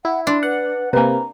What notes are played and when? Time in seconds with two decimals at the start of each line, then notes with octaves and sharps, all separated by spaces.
0.05 E4 F#5
0.27 D4 C6
0.43 B4 F#5
0.93 C3 A#3 B4 C5 G#5 A#5